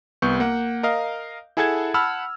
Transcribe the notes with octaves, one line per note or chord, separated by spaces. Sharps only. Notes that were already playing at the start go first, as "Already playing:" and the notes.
C2 B3 C#6 G6
A#3 F#5
A#4 D#5 F5
E4 G#4 A4 F#5 A5 G#6
F#5 A5 B5 E6 F6